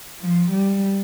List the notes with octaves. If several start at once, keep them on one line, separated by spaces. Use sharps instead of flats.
F3
G3